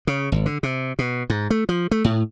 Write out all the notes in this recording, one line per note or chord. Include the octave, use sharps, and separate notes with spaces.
C#3
G#1
D3
C3
B2
G#2
A3
F3
A3
A2